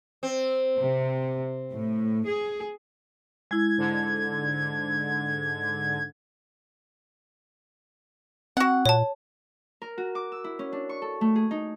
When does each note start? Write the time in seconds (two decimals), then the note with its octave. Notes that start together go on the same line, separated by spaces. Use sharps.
0.23 C4
0.80 C3
1.70 A2
2.25 G#4
3.51 G#3 E4 G#6
3.77 G#2 D3
8.57 C4 F#4 F#5
8.86 A#2 C#5 A5
9.82 A#4
9.98 F#4
10.15 D6
10.32 E6
10.44 E4
10.59 C#4
10.72 D4
10.89 C#6
11.02 A4
11.21 A3
11.36 G#4
11.51 D#4